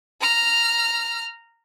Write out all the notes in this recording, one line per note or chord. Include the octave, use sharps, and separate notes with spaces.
A#5 F6